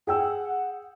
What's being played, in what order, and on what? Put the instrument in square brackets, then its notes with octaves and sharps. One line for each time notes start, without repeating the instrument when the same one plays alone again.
[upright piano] G#4 G5 E6 [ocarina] F#5